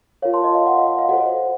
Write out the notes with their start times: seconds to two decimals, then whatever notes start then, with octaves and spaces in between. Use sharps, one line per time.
0.22 F4 A#4 C#5 F5
0.33 A5 C6
0.44 D#5
0.55 F5
0.66 D#5 F#5
0.77 F5
0.87 D#5
0.98 F5
1.09 F#4 A4 C5 D#5 F#5